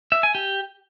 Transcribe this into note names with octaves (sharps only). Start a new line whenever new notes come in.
E5
G#5
G4